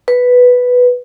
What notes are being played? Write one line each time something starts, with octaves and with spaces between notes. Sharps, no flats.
B4